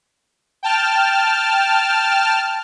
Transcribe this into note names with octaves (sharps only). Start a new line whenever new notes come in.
G5 A5 F6